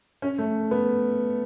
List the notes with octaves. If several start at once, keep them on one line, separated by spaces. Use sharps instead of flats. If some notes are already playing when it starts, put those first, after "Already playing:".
C#4
A3
B3